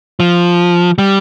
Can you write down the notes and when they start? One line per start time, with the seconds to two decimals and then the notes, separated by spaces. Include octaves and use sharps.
0.20 F3
0.98 G3